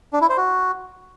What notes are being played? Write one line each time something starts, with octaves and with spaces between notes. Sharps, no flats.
D4
E4
C5
F#4